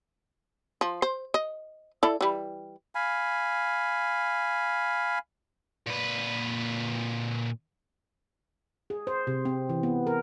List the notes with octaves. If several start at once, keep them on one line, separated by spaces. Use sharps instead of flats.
F3
C5
D#5
E4 A4 D5
E3 G3
F5 G#5 B5
A#2 B4
G#4
C5
C3
C4
E3
B3
A#4